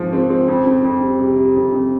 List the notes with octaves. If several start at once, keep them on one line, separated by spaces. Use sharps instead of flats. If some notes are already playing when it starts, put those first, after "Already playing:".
Already playing: G#2 F3 C4 F4
C4
C4
F2
F2
F2
G3
C3
C3
F2
F2